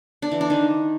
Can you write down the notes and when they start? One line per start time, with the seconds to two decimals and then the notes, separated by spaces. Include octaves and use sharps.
0.22 D4
0.32 E3
0.41 D4
0.50 D#3